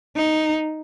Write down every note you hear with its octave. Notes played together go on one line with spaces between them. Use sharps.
D#4